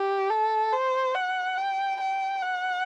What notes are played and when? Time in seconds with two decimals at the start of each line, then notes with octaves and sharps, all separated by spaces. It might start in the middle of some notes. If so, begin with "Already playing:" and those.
Already playing: G4
0.30 A4
0.73 C5
1.14 F#5
1.57 G5
2.00 G5
2.42 F#5